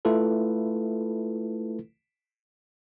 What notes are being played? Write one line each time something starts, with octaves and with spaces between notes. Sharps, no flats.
A3 E4 F4 A4 B4